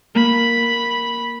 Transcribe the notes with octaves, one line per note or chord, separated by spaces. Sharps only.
A#3 B5